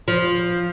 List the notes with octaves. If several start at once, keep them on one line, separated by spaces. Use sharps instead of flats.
F3